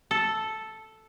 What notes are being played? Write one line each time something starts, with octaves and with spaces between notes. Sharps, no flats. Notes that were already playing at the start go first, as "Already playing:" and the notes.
A4